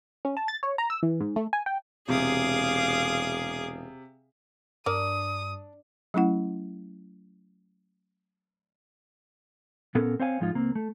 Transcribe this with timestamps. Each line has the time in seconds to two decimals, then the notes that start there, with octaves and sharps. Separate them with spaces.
0.25 C#4
0.37 A5
0.48 A6
0.63 C#5
0.78 A#5
0.90 E6
1.03 E3
1.20 G#2
1.36 A3
1.53 G#5
1.66 G5
2.09 E1 C3 G#4 F5 D6 D#6
4.86 G2 D4 A#4 D5 D#6
6.14 F#3 A3 C#4 E4 F#5
9.95 A#2 B3 C#4 A4 A#4
10.19 C4 C5 C#5 F5 G#5
10.40 G#2 F3 G#3 D#4 F4
10.54 C#2 A#3 C4
10.75 A3